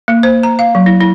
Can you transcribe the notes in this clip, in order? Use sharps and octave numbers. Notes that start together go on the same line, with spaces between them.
A#3
C5
A#5
F5
F#3
E4
E4